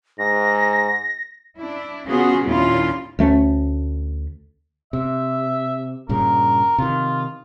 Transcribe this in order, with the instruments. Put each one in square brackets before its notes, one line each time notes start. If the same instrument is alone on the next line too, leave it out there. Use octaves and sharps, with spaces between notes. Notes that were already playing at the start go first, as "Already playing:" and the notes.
[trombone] G#2 [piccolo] A#6
[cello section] D4 E4
C#3 B3 C#4 F4 F#4 G#4
D#2 A#2 C#4 D4 E4 F4
[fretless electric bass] D2 A3 B3 C#4
[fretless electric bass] C3 [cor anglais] E5
[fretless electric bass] G2 A#2 C#3 [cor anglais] A#4
[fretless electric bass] C3 D#3 [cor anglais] F4